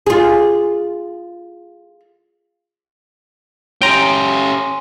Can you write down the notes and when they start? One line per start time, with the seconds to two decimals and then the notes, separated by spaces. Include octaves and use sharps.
0.06 F4 G#4
3.82 C#4 G4 G5 G#5 A#5 C6 D#7